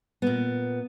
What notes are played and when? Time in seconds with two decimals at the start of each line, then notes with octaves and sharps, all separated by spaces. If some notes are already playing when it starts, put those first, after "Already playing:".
0.22 A#2 B3